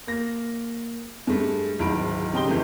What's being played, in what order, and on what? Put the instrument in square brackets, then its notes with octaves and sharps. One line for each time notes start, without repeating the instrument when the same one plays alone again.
[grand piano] A#3 A#6
G2 G#3 A3
D1 G#1 G#2 B5 D7
C#3 D#4 G4 G5 C6 G7
D1 G#1 E3 A3